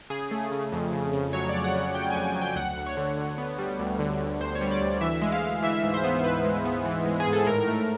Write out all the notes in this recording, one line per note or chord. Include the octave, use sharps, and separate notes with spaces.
C#3 G#4
A3
C#3
F2
C#3
C#3
F#3 C#5
F2 D5
F#5
C#3
C#3 G5
G#5
F2
G#5
F#3
G5
D2 F#5
D2
C#5
D3
D3
B3
G3
D2
D3
D2
D2 C5
C#5
G3
D5
D2
E3 E5
G#3
F5
G#3
E3 E5
G#2
C5
B3
G#2 B4
G#3
B3
E3
G#3
G#4
G#2
A4
A2 A#4
A3